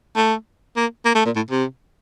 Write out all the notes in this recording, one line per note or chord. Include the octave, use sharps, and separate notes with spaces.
A3
A#3
A#3
A3
A#2
A2
C3